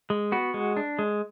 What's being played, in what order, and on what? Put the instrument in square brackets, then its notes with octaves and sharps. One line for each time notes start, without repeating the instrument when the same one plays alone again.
[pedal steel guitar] G#3
B3 F#4
G#3
D4
G#3